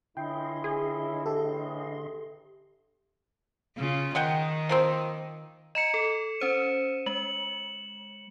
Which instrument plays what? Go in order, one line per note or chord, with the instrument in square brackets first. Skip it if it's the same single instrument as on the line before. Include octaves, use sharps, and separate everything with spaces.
[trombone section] C#2 C#4 E4 [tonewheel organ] D3 D#5 C6 [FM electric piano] G5
[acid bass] G#4
[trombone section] A1 [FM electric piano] G4 A4 E5
[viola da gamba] C#3 F4
[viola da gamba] D#3 [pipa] G#3 F#5 G5
[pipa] F3 A#3 C4
[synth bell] D#5 A#5 [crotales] C#7 E7
[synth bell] A4
C#4 C5 D#7
[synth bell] G#3 [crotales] F#7